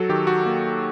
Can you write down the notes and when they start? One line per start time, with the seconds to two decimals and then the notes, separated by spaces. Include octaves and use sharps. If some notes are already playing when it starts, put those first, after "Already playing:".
Already playing: F#3 F#4 A4
0.09 D#3 G4
0.27 F#4
0.46 A#3